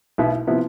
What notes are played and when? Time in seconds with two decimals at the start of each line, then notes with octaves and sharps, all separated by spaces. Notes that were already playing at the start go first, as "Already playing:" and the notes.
0.18 B1 B2 B3 E4 B4
0.47 C3 F3 B3 E4